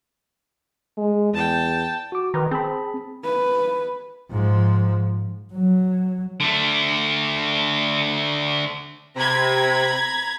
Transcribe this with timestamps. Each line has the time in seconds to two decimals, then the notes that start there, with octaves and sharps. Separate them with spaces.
0.97 G#3
1.34 E2 G5 A5
2.12 F#4 D6
2.34 D#3 B4 A#5
2.51 C4 G#4 A5 B5
3.24 B4
4.31 G#2 F3
5.54 F#3
6.40 D3 A3
9.17 C3 A#5 B5 G#6